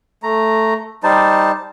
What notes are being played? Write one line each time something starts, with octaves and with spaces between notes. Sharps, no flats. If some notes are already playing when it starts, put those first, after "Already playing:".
A3 A#5
G3 D#4 C5 A5